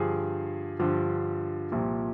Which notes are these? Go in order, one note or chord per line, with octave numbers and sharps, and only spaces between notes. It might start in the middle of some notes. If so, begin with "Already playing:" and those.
Already playing: G2 D3 F3 G#4
G2 D3 F3
C2 A#2 F3